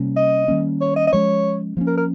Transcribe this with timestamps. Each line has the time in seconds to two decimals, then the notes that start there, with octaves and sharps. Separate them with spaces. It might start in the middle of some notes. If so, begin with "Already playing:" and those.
Already playing: C3 G3 A#3 C#4
0.17 D#5
0.48 D#3 G3 A#3 C#4
0.81 C#5
0.96 D#5
1.07 D#5
1.13 F3 G#3 C#4 C#5
1.77 F3 A#3 C#4
1.87 A#4
1.97 A#4